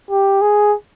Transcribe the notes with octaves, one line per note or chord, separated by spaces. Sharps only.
G4
G#4